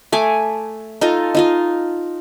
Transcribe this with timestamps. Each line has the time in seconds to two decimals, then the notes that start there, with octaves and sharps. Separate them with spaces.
0.12 A3 G#5 D6
1.01 D#4 F4 A4 D#5
1.35 D#4 F4 D#5